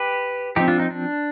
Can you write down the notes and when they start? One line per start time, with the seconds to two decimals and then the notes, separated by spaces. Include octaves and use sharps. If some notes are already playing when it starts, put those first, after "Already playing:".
Already playing: G4 B4
0.56 F3 C4 D#4 G4
0.68 D4 F4
0.79 D#4
0.90 D4